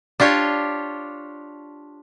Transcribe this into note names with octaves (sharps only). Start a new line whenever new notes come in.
D4 F4 G4 C#5